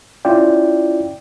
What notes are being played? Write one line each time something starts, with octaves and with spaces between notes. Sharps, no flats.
C#4 E4 F4 D5 G5